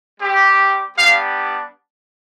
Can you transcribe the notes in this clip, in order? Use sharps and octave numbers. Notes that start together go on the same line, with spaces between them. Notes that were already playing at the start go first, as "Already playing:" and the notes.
G3 C4 G4
G3 B3 D4 G4 F5